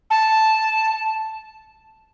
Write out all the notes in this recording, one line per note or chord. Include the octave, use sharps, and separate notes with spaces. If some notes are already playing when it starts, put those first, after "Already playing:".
A5